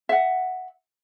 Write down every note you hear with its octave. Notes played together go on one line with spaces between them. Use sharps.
E5 F#5